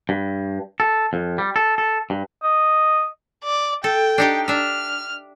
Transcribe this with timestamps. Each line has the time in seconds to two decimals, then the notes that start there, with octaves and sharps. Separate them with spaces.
0.09 G2
0.80 A4
1.13 F2
1.38 G3
1.56 A4
1.78 A4
2.10 G2
2.43 D#5
3.44 D5
3.84 A4 G5
4.18 D4 D#4 G4
4.48 D4 E5 F6